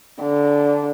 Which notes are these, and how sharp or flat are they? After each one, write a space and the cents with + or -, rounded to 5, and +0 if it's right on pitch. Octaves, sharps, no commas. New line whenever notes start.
D3 -15